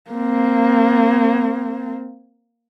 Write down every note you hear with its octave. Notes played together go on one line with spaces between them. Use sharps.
A#3 C4